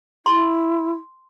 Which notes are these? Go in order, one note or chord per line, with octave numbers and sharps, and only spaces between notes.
E4 C6